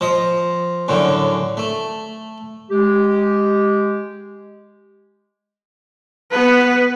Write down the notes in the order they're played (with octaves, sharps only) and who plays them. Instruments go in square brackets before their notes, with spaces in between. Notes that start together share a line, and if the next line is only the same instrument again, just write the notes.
[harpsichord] F3 D#5
F#2 A2 D3
A3
[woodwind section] G#3 G4
[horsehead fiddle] B3 B4